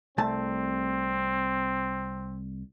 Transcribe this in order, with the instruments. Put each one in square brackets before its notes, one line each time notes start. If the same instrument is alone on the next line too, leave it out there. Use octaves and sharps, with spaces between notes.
[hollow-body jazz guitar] C2 A3 A5 [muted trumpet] C4